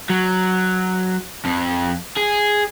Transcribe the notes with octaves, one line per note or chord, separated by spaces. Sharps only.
F#3
F2
G#4